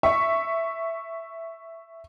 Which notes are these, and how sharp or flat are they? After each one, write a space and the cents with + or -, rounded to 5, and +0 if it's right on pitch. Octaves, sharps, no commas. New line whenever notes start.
E5 +0 C#6 +0